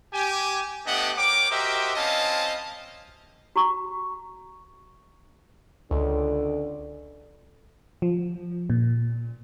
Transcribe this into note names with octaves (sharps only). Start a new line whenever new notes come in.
G4 G#5
A3 B3 D4 G4 D#5 F#5
A#4 C#5 G5 D6
F#4 G4 A#4 C5 D#5 E5
C4 C#4 E4 D#5 F5 A5
F#4 A#5 C#6
C#2 D3
F3
A#2